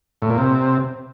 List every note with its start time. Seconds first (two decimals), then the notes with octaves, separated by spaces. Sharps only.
0.22 A2
0.30 A#2
0.38 C3